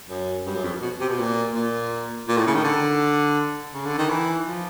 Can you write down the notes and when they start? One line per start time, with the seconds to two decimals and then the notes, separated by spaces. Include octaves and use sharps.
0.10 F#2
0.46 G2
0.56 F#2
0.64 F2
0.82 B2
1.00 C3
1.09 B2
1.19 A#2
1.55 A#2
2.28 A#2
2.37 A2
2.47 C#3
2.56 D#3
2.64 D3
3.74 C#3
3.86 D3
3.98 D#3
4.10 E3
4.47 F3